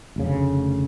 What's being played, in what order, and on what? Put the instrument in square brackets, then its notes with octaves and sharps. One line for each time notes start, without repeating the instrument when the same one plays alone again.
[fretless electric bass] F1 D2 C#3